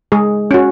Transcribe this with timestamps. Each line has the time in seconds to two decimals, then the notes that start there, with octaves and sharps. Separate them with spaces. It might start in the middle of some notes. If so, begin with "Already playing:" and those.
0.12 G#3 G#4
0.51 C#4 F#4